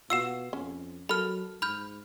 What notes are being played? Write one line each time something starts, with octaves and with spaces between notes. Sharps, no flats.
B2 F4 F#4 E6 C7 E7
F2 C#4
F#3 A4 A#4 B5 F6
G#2 B5 F6 G6